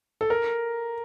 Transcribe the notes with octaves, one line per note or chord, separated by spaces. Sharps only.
A4
A#4